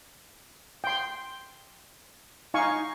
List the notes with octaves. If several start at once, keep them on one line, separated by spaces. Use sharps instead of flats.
G5 C6
D#4 F5 G#5 C#6